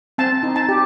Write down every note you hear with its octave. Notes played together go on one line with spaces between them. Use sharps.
C4 A5
D#4
A5
G4